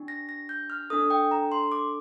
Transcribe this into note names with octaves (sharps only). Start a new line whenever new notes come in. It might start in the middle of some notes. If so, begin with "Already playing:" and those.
Already playing: D4 G4
A#6
A#6
G6
F6
D4 A4 D#6
G5
A#5
C6
D6